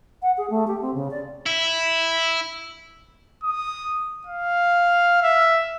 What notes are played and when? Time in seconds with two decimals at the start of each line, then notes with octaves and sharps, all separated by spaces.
0.22 F#5
0.37 G#4
0.50 A3
0.67 G4
0.81 C4
0.94 C#3
1.11 D5
1.46 E4
3.44 D#6
4.27 F5
5.23 E5